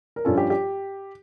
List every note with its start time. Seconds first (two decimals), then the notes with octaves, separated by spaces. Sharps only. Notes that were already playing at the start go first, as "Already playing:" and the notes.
0.16 A#4
0.25 G2 F3 C#4 F4 A4
0.38 G4
0.50 G4